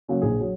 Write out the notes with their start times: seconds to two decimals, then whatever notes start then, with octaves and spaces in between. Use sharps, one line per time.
0.08 C#3 F#3 A#3
0.22 A#1 G#4
0.41 F#3